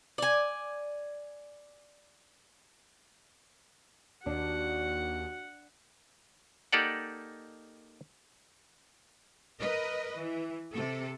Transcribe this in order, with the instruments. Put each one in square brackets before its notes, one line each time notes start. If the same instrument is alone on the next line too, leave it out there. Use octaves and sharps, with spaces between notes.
[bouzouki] D5 G#5
[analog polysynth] D#2 [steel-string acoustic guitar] D4 [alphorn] F#4 [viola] F#5
[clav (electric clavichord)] A#3 D#4 G4 A4 D5 F#5
[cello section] A#4 B4 D#5
E3
C3 A4